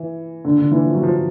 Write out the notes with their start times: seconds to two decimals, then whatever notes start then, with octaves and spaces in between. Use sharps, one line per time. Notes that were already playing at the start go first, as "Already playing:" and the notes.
Already playing: E3
0.45 D3
0.58 D3
0.71 E3
0.85 F3
0.94 F#3
1.03 F3